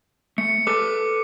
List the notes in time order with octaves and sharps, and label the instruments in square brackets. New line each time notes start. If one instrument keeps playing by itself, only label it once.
[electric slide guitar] A3 [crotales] C#7
[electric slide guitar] A4 B4 [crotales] D6